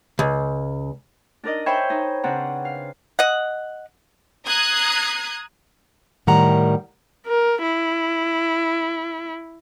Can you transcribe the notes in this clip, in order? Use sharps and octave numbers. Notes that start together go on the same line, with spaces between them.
C#2
D4 D#4 A#4 D5 D#5
C5 C#5 E5 G5 G#5 B5
D#4
C#3 C4 D4 B4 F#5 A#5
F5
D#5 F#5
A#5 D#6 F#6 G#6 C7
A2 D#3 G3 A#4 F#5 A#5
A#4
E4